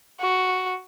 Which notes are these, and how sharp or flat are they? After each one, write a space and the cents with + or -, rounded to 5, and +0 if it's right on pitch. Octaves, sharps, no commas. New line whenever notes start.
F#4 +0